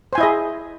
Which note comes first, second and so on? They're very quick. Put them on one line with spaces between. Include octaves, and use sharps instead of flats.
C5 G#5 E4 D#5 G#4